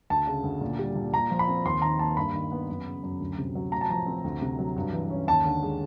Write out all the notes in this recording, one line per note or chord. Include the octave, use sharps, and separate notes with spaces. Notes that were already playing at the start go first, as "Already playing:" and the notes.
D2 A5
C#3
D2
A#2
G3
A#2
A#2 A#5
F3
B5
C4
D#2 C6
D#3 A#5
A#3 A5
G2 B5
D#3
B3
F#2
C#3
F#2
D2
C3
F#3
A2 A#5
A5
F3 A#5
C4
D2
C3
F#3
G2
E3
C#4
D#2 A5
D3
G#3